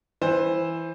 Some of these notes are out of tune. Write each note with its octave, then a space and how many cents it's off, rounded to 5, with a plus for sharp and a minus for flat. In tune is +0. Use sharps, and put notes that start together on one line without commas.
E3 +0 C5 +15